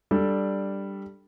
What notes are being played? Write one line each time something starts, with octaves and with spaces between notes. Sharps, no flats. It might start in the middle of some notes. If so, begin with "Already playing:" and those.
G3 D4 A4